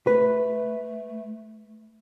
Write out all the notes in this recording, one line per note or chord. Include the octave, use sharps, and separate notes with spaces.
A3 B4